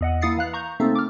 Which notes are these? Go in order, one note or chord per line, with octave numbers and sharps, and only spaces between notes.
E2 D#5 F#5
A#3 E4 D#6 A6 C7 C#7
E3 F5 F#6
A#5 C#6 G6
C3 A3 A#3 C4 D#4 A4
D6 F6